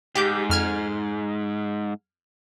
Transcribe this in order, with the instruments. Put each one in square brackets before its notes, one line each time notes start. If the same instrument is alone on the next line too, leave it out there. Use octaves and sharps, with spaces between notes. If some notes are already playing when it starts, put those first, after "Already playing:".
[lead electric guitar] G#2 [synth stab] G4 D6 G6
[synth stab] F2 F6 G#6